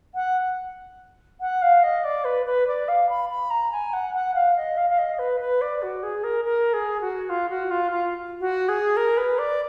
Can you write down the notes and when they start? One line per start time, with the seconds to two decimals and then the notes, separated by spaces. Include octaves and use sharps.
0.14 F#5
1.40 F#5
1.62 F5
1.83 D#5
2.04 D5
2.24 B4
2.45 B4
2.67 D5
2.88 F5
3.09 B5
3.29 B5
3.50 A#5
3.71 G#5
3.93 F#5
4.14 F#5
4.34 F5
4.56 D#5
4.77 F5
4.89 F5
4.98 D#5
5.18 B4
5.40 B4
5.61 D5
5.82 F#4
6.02 G#4
6.23 A#4
6.44 A#4
6.73 G#4
7.00 F#4
7.29 F4
7.49 F#4
7.70 F4
7.91 F4
8.40 F#4
8.68 G#4
8.96 A#4
9.17 B4
9.38 D5